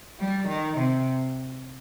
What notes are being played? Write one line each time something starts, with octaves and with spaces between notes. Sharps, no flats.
G3
D#3
C3